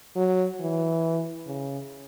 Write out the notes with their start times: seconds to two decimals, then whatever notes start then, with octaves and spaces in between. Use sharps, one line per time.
0.16 F#3
0.60 E3
1.47 C#3